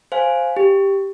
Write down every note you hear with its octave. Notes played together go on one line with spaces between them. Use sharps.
C5 F5 G#5
G4